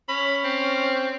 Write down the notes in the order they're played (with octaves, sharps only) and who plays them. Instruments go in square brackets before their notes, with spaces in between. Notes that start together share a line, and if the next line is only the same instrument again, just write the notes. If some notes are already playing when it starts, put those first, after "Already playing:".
[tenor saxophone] C#4 [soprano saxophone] B5
[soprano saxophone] C4